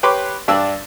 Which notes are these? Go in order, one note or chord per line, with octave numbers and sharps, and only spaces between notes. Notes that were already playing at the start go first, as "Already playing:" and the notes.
G4 B4 C#5 C6 D6
G2 D4 D5 A5 E6